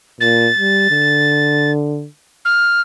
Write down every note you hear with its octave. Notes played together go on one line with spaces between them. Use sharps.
A#2 A6
G3
D3
F6